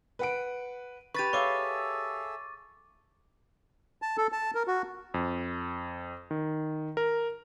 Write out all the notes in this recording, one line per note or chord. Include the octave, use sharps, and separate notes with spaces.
B4 F#5 D7
G4 B4 C#6 A6 D#7
G#4 A4 C#5 E5 F5 C#6 D6
A5
A4
A5
A#4
F#4
F2
D#3
A#4